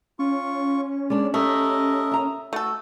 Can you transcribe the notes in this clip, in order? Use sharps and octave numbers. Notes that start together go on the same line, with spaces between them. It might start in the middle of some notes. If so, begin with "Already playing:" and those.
C#4 F4 C#6
G#3 D4 D5
A3 G4 A4 A#4 D#5
E5 A#5
A3 F#4 A4